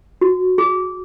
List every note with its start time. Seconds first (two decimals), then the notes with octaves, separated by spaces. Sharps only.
0.21 F#4
0.58 G#4